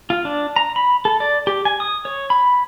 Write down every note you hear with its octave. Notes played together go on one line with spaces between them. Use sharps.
F4
D4
A#5
B5
A4
D5
G4
G#5
D#6
C#5
B5